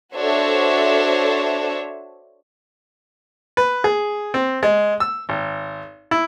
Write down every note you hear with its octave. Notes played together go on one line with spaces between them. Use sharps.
D4 F#4 A4 C5 C#5 E5
B4
G#4
C4
G#3
E6
G#1
E4